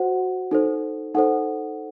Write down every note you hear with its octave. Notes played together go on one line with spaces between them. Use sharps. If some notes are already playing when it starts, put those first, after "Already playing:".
Already playing: F#4 C5 F#5
D#4 A4 C5
D#4 A4 C5 F#5